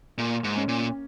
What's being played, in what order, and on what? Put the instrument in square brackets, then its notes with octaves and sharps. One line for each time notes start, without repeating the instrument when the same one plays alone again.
[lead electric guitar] A#2 [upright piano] A#3
[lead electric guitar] G#2
[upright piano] C#4
[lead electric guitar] A#2